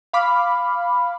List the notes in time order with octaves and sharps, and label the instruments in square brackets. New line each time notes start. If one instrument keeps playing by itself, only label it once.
[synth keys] F5 B5 D6 F6